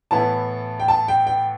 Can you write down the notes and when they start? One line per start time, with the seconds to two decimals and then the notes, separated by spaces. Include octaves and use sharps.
0.11 A2 E3 B3 E4 A5
0.80 G5
0.88 A5
1.08 G5
1.27 G5